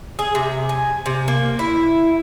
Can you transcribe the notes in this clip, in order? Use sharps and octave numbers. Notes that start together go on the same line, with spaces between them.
G#4
C3
G#5
C3
A#3
E4